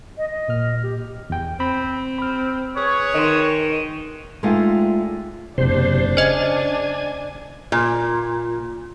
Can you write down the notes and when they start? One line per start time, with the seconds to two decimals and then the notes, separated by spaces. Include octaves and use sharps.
0.18 D#5
0.30 D#5
0.48 A#2 F6
0.83 G4
1.30 E2 G5
1.60 C4 B5
2.19 B5 F6
2.76 G#4 B4 C#5
3.14 D#3 D#5 C6
4.43 G#3 A3 D4 D#4 F4 G5
5.58 F#1 E2 C3 D4 C5
6.17 C#3 C5 D#5 G#5
7.72 A#2